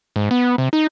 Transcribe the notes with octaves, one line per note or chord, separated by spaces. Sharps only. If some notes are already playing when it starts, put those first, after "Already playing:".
G#2
B3
C3
D#4